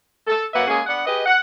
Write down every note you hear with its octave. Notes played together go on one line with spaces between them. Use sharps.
A4
F#2 A#3 B4 E5 F#5
G#3 A#3 C#4 G#4
B3 D4 F#5
G4 G#4 B4 D#5
F#5